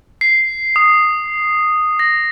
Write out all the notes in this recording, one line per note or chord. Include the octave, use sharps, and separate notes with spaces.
C7
D#6
A#6